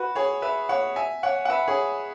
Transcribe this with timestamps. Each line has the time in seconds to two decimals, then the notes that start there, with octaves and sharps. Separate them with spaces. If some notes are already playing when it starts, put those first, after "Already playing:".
Already playing: F#4 B4
0.15 G#4 C#5
0.42 B4 E5
0.69 C#5 F#5
0.96 E5 G#5
1.23 C#5 F#5
1.45 F#5
1.50 B4 E5
1.68 G#4 C#5